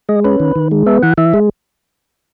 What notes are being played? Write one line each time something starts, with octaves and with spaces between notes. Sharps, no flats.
G#3 D#5
C#4 B4
D#3
D#3
G#3
B3 E5
E3 F#5
E3 E5
G#3